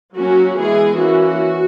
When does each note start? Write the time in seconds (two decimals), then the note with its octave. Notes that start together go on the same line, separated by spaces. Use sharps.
0.15 F#3 A#3 C#4 F#4
0.57 E3 G#3 B3 G#4
0.96 E3 A#3 C#4 F#4